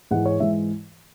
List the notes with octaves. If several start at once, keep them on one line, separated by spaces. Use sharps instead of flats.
G#2 E3 G#3 F#5
C#5
G#2 E3 G#3 E5